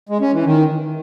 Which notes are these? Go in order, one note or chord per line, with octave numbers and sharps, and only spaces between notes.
G#3
C#4
E3
D#3